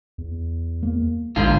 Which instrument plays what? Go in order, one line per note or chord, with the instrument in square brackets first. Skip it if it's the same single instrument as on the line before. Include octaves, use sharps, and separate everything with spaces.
[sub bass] E2
[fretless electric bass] A#3
[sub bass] A#1 [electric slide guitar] G#2 D3 F4